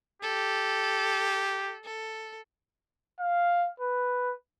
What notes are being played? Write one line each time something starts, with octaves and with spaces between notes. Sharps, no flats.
G4 A4
A4
F5
B4